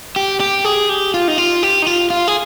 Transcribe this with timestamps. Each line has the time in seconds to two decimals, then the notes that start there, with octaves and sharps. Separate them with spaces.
0.16 G4
0.40 G4
0.65 G#4
0.89 G4
1.14 F4
1.28 D#4
1.38 F4
1.63 G4
1.82 D#4
1.87 F4
2.10 F4
2.28 G#4